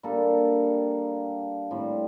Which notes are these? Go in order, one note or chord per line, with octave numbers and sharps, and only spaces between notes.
G3 A#3 D4 A4
A2 G3 C4